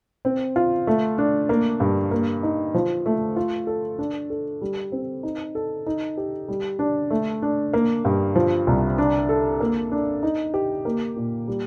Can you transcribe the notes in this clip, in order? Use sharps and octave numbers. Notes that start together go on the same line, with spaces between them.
C4
F4
A3
D4
A#3
G2
A#3
D#4
F3
A3
F4
A4
D4
A4
G3
C4
D#4
A4
D#4
G4
G3
D4
A3
D4
A#3
G2
F3
C2
D4
A4
A#3
D4
D#4
G4
A#3
A#2
G3